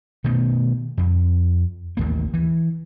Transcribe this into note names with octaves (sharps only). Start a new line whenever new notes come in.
B2 D#3 A3
F2
A1 D#2 A#3
E3